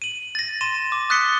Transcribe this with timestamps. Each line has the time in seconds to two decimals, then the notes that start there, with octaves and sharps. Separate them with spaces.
0.02 D#7 F#7
0.35 A6 A#6
0.61 C6 D#7 E7
0.92 D6
1.10 D#6 F#6 A6 B6 C#7 G7